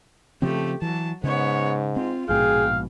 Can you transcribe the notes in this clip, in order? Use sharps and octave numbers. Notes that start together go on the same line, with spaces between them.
C#3 F3 A3 C4 G4
E3 F#3 A5
G#2 C#3 B3 C#5
C4 F4
A#1 G#2 B2 G#4 F5 G5